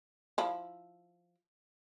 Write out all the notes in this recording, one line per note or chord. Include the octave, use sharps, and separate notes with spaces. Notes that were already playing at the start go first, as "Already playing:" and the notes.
F3 E4